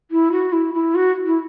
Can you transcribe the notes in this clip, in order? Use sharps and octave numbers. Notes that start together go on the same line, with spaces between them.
E4
F#4
E4
E4
F#4
E4